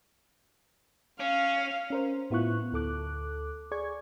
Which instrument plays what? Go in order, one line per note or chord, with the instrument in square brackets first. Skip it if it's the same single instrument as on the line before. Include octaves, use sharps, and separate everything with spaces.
[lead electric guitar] C#4 [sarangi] F5
[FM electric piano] C#4 A#4 C5
A2 B3 E4 F4 C#6 F#6
D2 A4 D6 F#6
G#4 D5 C#6 G#6